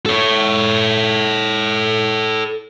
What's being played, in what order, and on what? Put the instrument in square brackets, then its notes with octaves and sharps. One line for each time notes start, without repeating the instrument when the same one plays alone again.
[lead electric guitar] A4 C#5